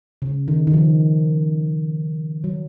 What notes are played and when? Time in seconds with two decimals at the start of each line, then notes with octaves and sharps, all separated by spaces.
0.22 C#3
0.48 D#3
0.67 D#3
0.74 F3
2.44 F#3